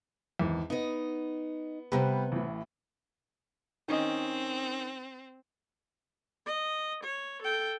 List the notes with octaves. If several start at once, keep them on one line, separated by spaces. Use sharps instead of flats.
G#1 E2
B3 D#4 D#5
C3 G3 B3 G4 B4
A1 A2
D#3 C4 C#4 D#5
D#5
C#5
A4 G5